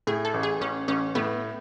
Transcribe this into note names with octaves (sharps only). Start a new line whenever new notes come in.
A2 G#4
A4
A1
G#4
A1 C#4
A1 C#4
A2 B3